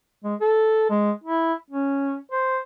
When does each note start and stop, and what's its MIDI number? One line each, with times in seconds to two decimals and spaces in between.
0.24 0.35 56
0.41 0.87 69
0.90 1.11 56
1.24 1.54 64
1.70 2.16 61
2.32 2.59 72